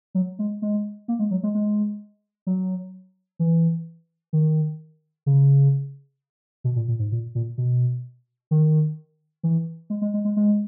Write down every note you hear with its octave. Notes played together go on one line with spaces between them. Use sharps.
F#3
G#3
G#3
A#3
G#3
F#3
G#3
G#3
F#3
E3
D#3
C#3
B2
A#2
A#2
G#2
A#2
A#2
B2
D#3
E3
G#3
G#3
G#3
G#3
G#3